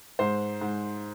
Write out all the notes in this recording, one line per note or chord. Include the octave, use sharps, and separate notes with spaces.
G#2 C5
G#2